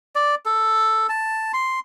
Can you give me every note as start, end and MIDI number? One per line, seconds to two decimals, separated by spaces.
0.15 0.35 74
0.46 1.07 69
1.09 1.52 81
1.54 1.80 84